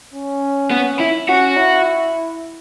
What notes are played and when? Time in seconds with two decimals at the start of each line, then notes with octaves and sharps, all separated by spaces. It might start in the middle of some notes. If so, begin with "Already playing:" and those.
0.14 C#4
0.71 B3
0.99 E4
1.28 C#4 F#4
1.56 E4